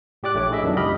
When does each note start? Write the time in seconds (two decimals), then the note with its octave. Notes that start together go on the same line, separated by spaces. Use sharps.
0.23 A2 G4 D5 D6 F#6
0.35 A#1 A3 D4 C#5 D6
0.51 E4 G#4 D#5 E5
0.63 F#2 D#3 B3 D4 F4
0.77 C#2 G4 D#5 B5 F6